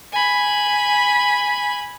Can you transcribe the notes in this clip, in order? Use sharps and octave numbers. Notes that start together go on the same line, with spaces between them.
G#5 B5